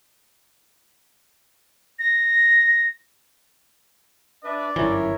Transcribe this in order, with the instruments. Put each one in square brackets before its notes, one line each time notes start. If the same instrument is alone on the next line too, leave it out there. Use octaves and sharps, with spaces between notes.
[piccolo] A#6
[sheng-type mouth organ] D4 B4 E5 [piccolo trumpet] D5
[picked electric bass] G1 F#2 E3 [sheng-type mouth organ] A#4 C#5 E5